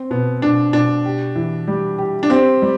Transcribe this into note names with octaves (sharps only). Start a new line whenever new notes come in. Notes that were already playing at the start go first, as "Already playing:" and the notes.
Already playing: C4
B2 B3
B2 D4
B2 D4
G4
E3
G3
G4
D4
C4 G4
G3